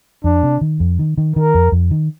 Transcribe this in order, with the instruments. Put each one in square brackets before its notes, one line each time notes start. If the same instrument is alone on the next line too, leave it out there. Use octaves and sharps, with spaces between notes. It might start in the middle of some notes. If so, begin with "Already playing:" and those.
[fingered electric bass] F2 [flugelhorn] D4
[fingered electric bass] C3
D#3
F2
D#3
D#3
[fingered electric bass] D#3 [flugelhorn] A#4
[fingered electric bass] F2
F2
D#3